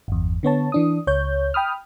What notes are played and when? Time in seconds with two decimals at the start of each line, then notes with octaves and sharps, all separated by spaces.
0.08 G1 E2
0.43 D3 B3 C#5 A5
0.72 E3 D4 D#6
1.07 C#2 C#5 G6
1.54 G5 B5 D#6 F6